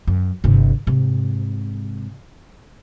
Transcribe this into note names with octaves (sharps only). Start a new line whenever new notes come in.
F#2
G1 C3
G#2 C3